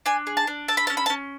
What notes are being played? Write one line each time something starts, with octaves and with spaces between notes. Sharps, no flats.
D4 G#5
G#4
A5
D4
A4 A5
B5
C#4 A5
B5
A5
C#4